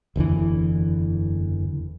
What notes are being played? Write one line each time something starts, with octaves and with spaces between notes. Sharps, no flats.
F#1 E2 D3 E3